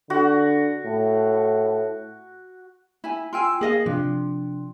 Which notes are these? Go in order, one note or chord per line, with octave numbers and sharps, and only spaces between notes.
D3 F#4
A2
E4 G#5
F4 G5 G#5 C6 E6
A#3 G#4 D#5 F5
C3 F3 D4